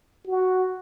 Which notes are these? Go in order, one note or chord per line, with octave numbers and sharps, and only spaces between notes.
F#4